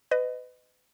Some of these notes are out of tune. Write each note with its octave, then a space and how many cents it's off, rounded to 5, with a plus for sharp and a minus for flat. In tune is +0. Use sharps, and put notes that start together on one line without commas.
B4 +30 D#5 -10